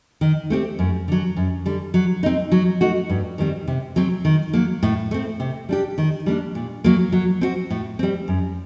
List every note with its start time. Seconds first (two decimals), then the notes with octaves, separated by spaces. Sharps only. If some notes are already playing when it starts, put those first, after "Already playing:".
0.21 D#3
0.50 A3 C4 G4
0.79 F#2
1.08 D3 F#3
1.37 F#2
1.66 D3 G3
1.94 F#3
2.23 C4 D#4
2.52 F#3
2.81 A3 D#4 F#4
3.10 G2
3.38 D#3 G3 C4
3.68 C3
3.96 F#3 C4
4.25 D#3
4.53 F#3 A#3
4.83 A2
5.11 A3 C4
5.40 C3
5.69 G3 D4 G4
5.98 D#3
6.26 G3 A#3 D4
6.55 A#2
6.84 F#3 A#3
7.12 F#3
7.41 C4 F#4
7.70 A2
7.99 G3 C4
8.28 F#2